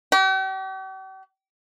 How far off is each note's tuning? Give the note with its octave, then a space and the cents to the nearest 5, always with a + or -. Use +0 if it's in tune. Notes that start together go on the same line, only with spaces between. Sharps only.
G4 -45